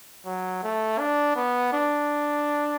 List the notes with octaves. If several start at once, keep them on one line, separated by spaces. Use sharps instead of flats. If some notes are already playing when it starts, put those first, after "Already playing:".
F#3
A3
D4
B3
D4